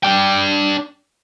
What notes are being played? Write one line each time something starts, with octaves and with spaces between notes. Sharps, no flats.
D4 G5